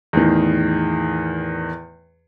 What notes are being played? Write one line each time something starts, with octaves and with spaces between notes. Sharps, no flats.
E2 A2 D#3